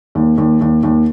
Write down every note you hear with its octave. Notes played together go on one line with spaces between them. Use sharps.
D#2
D#2
D#2
D#2